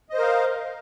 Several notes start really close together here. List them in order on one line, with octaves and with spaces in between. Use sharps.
D#5 C5 A#4 F5